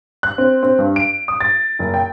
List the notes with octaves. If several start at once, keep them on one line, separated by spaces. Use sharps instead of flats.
F#6
C4
C4
G2
D7
D#6
A6
F#1
G5